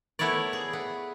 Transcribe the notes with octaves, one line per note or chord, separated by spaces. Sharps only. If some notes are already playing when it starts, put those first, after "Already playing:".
A3 B3 E4 A#4 C#5 D5
G#4
B3